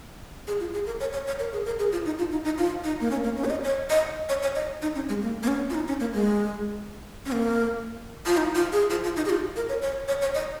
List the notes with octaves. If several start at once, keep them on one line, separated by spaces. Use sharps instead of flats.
G#4
F4
G#4
A#4
C#5
C#5
C#5
A#4
G#4
A#4
G#4
F4
D#4
F4
D#4
D#4
F4
D#4
A#3
C#4
A#3
C#4
C#5
D#5
C#5
D#5
C#5
C#5
D#5
D#4
C#4
G#3
A#3
A#3
C#4
F4
D#4
C#4
A#3
G#3
C#4
A#3
F4
D#4
F4
G#4
F4
F4
D#4
G#4
F4
A#4
C#5
C#5
C#5
C#5
D#5